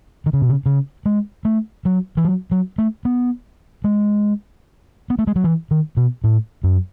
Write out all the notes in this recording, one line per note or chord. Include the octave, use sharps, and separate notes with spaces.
D#3
C#3
B2
C#3
C#3
G#3
A3
F#3
E3
F#3
F#3
A3
B3
G#3
B3
A3
G#3
F#3
E3
D#3
B2
A2
F#2